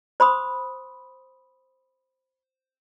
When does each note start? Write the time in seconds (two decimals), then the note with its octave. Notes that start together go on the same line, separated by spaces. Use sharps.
0.20 C5 B5 C6 D#6